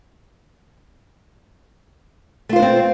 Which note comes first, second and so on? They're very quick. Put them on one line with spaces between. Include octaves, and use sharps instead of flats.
A3 F4 C5 D4 C4